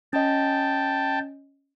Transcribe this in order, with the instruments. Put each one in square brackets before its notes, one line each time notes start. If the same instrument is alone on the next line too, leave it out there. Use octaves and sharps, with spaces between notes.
[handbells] C#4 D#5 [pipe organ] G5 A5